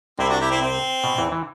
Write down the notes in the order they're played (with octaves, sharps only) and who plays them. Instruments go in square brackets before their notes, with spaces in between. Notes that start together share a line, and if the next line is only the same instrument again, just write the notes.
[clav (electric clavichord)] C2 C3 [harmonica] C4 E4
[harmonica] D4 F#4
E4 G4
C4 E4
C4
[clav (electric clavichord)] B2
E2 E3
E3